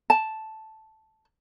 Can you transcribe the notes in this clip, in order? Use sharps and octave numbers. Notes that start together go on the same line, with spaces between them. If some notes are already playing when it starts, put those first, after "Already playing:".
A5